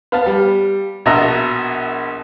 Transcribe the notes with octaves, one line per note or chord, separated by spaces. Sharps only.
B3 F5 A5
G3
A#1 B2 E5 A5 A#5